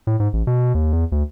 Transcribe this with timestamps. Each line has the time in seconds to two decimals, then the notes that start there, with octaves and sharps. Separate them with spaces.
0.07 A2
0.20 G#2
0.33 A1
0.47 B2
0.75 D#2
0.93 E2
1.12 D2